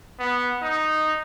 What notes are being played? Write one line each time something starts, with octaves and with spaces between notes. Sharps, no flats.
B3
D#4